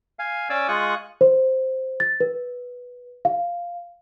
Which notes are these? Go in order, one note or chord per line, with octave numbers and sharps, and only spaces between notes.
F5 G#5
C#4 D5 G#5 D6 E6
G#3 F4 C#6 D#6 F#6
C5
A6
B4
F5